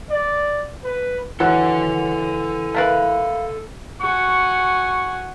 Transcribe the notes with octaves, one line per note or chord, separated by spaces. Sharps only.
D5
B4
E3 F#3 A4 F#5
A3 A#3 B4
F#4 G#5 C#6